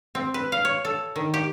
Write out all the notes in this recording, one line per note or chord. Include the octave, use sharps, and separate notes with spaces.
C4
B4
F5
C#5
A4
D#3
G4